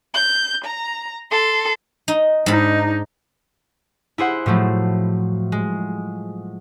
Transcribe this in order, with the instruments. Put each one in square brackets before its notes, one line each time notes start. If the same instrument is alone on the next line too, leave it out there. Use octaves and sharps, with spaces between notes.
[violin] G6
A#5
A4 C6
[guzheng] D#4
[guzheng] G#2 B5 [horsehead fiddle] D4 D#4
[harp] E4 G#4 C5 F#5
A2 F3 F#3 A3
G#3